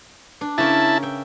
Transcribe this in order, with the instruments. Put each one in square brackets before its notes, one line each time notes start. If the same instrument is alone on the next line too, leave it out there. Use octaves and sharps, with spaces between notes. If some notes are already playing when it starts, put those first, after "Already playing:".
[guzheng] D4
[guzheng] C#3 C#4 A#4 [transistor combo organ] E4 A5
[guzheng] E5 G5